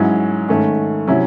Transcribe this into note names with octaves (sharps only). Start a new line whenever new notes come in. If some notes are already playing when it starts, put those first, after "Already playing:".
Already playing: G#2 F#3 C#4 E4
G#2 D#3 A3 C#4
C3 F#3 C#4 E4